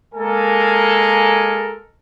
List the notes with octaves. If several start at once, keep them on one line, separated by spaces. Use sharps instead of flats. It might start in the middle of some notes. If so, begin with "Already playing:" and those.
G#3 A#3 A4 A#4 G#5